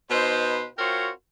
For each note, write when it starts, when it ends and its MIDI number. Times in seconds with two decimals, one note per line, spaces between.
0.10 0.66 47
0.10 0.66 63
0.10 0.66 71
0.10 0.66 72
0.78 1.10 60
0.78 1.10 65
0.78 1.10 66
0.78 1.10 70
0.78 1.10 72
0.78 1.10 73